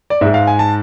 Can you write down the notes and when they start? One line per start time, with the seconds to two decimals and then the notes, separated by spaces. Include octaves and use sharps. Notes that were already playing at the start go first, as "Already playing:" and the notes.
0.10 D5
0.21 G#2 G#3 E5
0.34 F5
0.47 G#5
0.59 A5